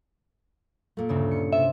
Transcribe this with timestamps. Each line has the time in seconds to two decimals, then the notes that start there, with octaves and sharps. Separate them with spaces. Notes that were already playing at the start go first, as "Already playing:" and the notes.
0.97 A#2 A3
1.09 D2 G2 C#3
1.31 C#7
1.52 C3 E5